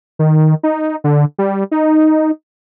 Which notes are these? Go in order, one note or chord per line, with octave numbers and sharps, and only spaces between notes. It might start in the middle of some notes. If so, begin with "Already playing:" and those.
D#3
D#4
D3
G3
D#4